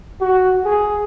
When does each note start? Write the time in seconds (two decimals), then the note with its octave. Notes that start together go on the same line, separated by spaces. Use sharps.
0.21 F#4
0.65 G#4